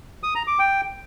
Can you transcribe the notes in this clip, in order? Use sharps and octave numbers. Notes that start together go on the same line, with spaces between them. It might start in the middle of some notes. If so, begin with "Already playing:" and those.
D#6
A#5
D6
G5